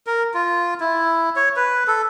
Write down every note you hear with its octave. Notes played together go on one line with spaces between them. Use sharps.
A#4
F4
E4
C#5
B4
A4